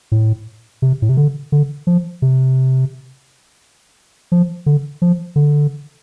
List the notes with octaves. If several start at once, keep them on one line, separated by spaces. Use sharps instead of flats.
A2
C3
A2
C3
D3
D3
F3
C3
F3
D3
F3
D3